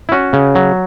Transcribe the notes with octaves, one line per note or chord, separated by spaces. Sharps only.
E4
C#4 F#4
C#3
F#3